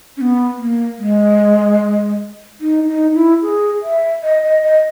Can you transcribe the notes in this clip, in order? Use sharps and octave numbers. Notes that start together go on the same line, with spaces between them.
C#4
B3
A#3
G#3
D#4
D#4
E4
G#4
E5
D#5
D#5
D#5